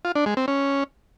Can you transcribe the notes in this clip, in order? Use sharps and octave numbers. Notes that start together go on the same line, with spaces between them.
F4
D4
G#3
C4
C#4